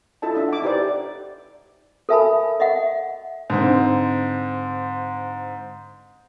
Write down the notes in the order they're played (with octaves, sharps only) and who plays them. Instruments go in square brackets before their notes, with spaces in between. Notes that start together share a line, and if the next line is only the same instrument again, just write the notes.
[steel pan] E4 F4 A4 D#5 A5
D4 E5 D#6
F#5 D6
D#4 E4 G4 B4 C5 D5
[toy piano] A4 A#4 E5 G#5 A5 B5
D#5 E5 F#5
[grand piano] G#2 D3 C4